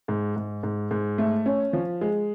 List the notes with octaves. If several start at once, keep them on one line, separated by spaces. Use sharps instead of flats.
G#2
G#2
G#2
G#2
A3
C#4
F3
G#3